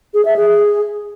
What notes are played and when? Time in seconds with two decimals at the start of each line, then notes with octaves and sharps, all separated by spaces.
0.14 G#4
0.25 E5
0.36 G#4